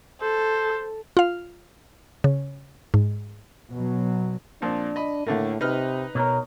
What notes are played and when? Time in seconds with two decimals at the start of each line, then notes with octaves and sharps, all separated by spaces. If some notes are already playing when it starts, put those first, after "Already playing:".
0.21 A4 C5
1.17 F4 F5
2.24 C#3
2.94 G#2
3.72 B2 F#3
4.62 A#2 F3 C4 D4
4.96 D#5 B5
5.27 A2 D3 A3 A#3
5.61 C3 D#4 B4 F6
6.15 B2 A#4 C#5 A#5